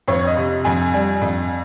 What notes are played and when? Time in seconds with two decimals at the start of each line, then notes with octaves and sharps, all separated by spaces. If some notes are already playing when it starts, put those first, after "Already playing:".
0.08 F2 C#5
0.27 D#5
0.37 C3
0.64 F2 G#5
0.94 G3 G#5
1.21 F2